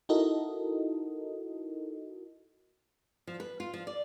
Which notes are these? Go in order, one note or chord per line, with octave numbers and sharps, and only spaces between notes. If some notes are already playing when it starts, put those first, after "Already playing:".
D#4 E4 F#4 A4 A#4 D#5
F3
B4
F4
F3
D5